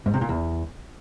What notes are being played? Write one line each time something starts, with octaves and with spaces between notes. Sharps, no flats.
G#2
C3
A#2
E2